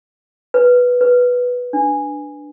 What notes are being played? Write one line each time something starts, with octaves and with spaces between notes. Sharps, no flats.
B4
B4
D4